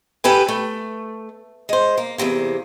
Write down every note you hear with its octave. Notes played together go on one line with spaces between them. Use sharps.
G4 A4 B4 G#5
A3
G#3 C5
A#3
E2 G2 C3 A#3